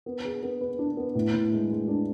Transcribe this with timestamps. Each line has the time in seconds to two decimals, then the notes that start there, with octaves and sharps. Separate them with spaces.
0.06 B3
0.25 G#4
0.42 B3
0.61 B4
0.79 D4
0.97 B3
1.15 A2
1.33 A2
1.52 G#3
1.70 G#3
1.88 D4